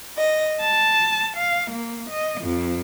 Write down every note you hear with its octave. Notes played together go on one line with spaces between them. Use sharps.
D#5
A5
F5
A#3
D#5
F2